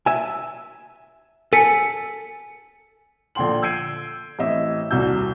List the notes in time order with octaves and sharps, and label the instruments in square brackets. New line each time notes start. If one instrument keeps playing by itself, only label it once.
[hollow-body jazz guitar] E5 G#5
[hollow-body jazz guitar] A4 [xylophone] G#5 B6 C#7
[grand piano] A#1 D3 A4 G5 C6 F#7
E6 G6 G#6 C7 D7 D#7
A1 C4 D#5 E5
D#1 C2 C3 F#4 E6 G6